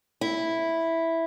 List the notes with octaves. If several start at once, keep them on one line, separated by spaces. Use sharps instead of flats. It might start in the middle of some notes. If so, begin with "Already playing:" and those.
E4